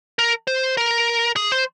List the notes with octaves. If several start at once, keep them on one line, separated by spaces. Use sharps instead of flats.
A#4
C5
A#4
G#4
C5